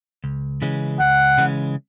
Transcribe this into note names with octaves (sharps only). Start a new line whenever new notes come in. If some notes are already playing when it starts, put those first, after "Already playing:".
C#2
C#3 E3 G#3 C#4
C#2 F#5
C#3 E3 G#3 C#4